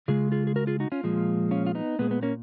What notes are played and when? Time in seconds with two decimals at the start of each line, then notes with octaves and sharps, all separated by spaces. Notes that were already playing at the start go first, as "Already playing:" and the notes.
0.08 C#3 G#3 F4 G#4
0.32 F4 G#4
0.47 G#4
0.56 F#4 A#4
0.67 F4 G#4
0.80 D#4 F#4
0.92 C#4 F4
1.03 A#2 F3 G#3
1.51 C#4 F4
1.66 F4
1.75 B3 D#4
1.99 A#2 G#3 B3
2.11 B3
2.23 A#3 C#4